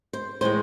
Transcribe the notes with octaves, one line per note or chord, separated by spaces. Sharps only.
C5
A2 E3 G#3 C5